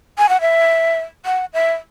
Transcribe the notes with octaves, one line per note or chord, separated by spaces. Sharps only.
G#5
F#5
E5
F#5
E5